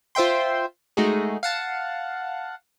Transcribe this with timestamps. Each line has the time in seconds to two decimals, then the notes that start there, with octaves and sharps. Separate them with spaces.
0.15 F4 C5 E5 G5 C6
0.97 G#3 A3 D#4 F#4 G#4
1.43 F5 F#5 A5